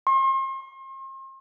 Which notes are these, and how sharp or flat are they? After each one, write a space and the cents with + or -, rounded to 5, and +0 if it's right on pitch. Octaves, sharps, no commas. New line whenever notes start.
C6 +40